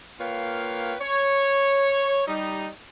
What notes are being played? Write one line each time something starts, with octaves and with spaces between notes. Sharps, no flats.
A#3 F4 B4 C#5 F5 G5
C#5
G3 D#4